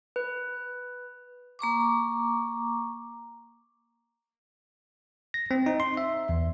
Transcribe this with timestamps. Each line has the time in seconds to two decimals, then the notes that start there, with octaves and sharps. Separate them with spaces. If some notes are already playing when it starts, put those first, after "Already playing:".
0.16 B4
1.59 A#3 A#5 C#6 D6
5.34 A#6
5.51 C4
5.66 D#4
5.80 C6
5.97 E5
6.29 E2